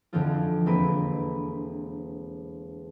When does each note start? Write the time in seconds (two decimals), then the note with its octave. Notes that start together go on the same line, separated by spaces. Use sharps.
0.13 F2 D3 E3 F3 C4 F4
0.66 E1 A#3 C4 B4